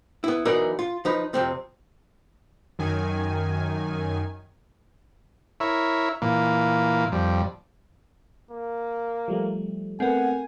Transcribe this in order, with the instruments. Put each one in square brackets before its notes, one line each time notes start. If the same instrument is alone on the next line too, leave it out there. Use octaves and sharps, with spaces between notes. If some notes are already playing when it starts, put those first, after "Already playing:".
[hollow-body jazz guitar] B3 E4
E3 F#3 B3 D#4 A#4 D5
F4
F3 D#4 B4
F2 C3 C4
[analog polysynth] F#2 D#3 G#5
[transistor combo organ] E4 A#4 C#5 E5
A#2 E3 A#3
F2 G3
[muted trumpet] A#3
[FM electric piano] F3 G3 A3
[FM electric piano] A3 B3 [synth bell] C4 A#4 [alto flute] F#5 [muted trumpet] G#5